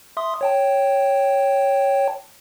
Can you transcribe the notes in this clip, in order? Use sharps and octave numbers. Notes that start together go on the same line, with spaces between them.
E5 C6 D#6
C#5 G5 A5